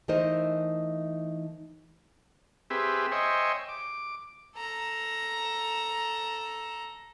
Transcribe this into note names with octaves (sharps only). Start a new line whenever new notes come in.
E3 A3 D#4 A#4 C5 D#5
C4 G4 G#4 B4 E5
C5 C#5 D#5 E5 G5 G#5
D6
A4 A#5